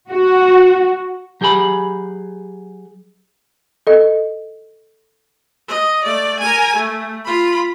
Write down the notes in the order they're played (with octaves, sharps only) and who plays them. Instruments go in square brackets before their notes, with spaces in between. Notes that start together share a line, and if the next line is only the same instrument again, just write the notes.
[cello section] F#4
[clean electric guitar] F#3 G4 G#4 G5 B5
[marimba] A4 D#5
[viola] D#5
A3 D5
A#4 G#5
A3
F4 B5